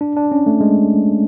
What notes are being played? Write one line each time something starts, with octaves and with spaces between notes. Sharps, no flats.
D4
D4
C#4
A3
G#3